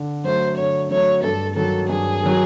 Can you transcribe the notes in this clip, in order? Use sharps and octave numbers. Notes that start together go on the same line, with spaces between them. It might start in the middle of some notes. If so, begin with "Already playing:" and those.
Already playing: D3
F#3 A3 C5
D3 C#5
F#3 A3 C#5
G2 A4
D#3 F#3 A4
G2 G#4
D#3 F#3